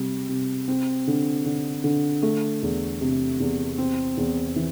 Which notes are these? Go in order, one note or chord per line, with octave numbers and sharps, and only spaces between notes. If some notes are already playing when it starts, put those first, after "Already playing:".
Already playing: C3 G3
C3
C4
D3
D3
D3
A3
E2
C3
E2
C4
E2
E3